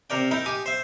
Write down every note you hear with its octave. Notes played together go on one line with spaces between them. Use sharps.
C3 A#4 D5 G5
D#4 E4 A#4 G5
G4 G#5 D6 D#6
C5 E5